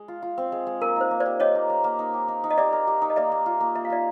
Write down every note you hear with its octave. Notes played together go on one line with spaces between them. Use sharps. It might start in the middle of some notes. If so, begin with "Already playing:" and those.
Already playing: G#3
F4
F4
C4
G#3
G#3
A#3 A#4
D#4 C5
A#3
C5 D5
G4
G4 C#5 D#5
A#3
A#3
A#3
D#4
G4
D#4
D#4
D#5
G4 D5 E5
A#4
G4
D#4
D#5
A#3 D5 E5
A#3
F4
A#3
A#3 E5
F5
F4 D5 E5